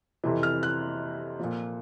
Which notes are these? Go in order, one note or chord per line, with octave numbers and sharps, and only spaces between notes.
F2 C3 E3
F6
F#6
A#2 F3